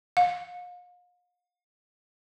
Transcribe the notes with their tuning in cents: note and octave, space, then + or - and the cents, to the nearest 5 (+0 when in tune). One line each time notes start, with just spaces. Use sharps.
F5 +40